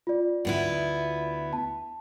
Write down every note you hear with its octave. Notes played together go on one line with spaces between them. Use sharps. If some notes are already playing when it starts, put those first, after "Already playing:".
F4 D5
D2 B3 E4
A5